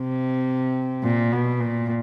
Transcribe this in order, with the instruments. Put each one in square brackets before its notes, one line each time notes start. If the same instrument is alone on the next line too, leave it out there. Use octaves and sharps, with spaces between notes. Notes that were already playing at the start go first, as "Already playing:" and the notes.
Already playing: [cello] C3
A#2
B2
A#2